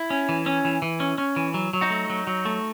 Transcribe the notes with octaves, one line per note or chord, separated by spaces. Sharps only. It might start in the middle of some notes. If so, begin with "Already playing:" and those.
Already playing: E4
C#4
E3
C#4
E3
E3
C#4
C#4
E3
F#3
F#3
D#4 F#4
A3
F#3
F#3
A3